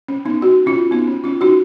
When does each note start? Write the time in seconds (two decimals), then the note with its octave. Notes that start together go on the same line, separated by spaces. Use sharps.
0.08 C#4
0.25 B3 D#4
0.41 D#4 F#4
0.66 C#4 F4
0.91 B3 D#4
1.07 C#4
1.24 C#4 F4
1.41 D#4 F#4